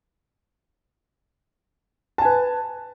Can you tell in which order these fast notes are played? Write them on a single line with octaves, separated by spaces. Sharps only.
A5 G#5 B4